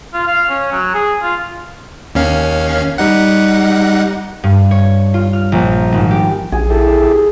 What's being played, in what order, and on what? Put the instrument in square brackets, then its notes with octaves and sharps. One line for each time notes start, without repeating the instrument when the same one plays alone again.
[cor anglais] F4
F5
C#4
F#3
G#4
F4
[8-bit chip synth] D#2 C#4 F5
G3 D#4 F#5
[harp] G2
C#5
F4
F6
A#1
G#1
G4
[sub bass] A#1 [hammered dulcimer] G#4
[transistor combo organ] E4 G4 A4